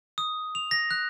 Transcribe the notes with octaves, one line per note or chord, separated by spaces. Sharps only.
D#6
F7
A#6
F#6